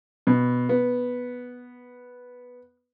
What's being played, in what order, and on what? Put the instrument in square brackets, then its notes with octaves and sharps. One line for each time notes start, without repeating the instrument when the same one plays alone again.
[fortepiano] B2
B3